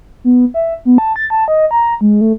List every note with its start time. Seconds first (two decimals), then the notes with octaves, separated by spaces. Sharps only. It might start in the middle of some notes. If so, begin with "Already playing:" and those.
0.24 B3
0.54 E5
0.85 B3
0.98 A5
1.16 A6
1.30 A5
1.48 D#5
1.71 A#5
2.01 G#3
2.21 A3